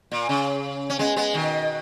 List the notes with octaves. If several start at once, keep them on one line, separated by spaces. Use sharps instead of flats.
A#2
C#3
C#4
G#3 B3
G#3 B3
B2 D#3